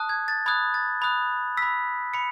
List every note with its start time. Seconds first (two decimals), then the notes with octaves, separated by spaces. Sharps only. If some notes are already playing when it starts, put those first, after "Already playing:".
Already playing: A5 D#6 F#6
0.09 G#6
0.28 A6
0.46 B5 D#6 F#6 G#6
0.74 A6
1.02 B5 D#6 F#6
1.57 B5 E6 B6
2.14 B5 C#7